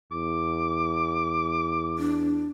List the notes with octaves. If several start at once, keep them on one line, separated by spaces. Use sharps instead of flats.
E2 D6
D4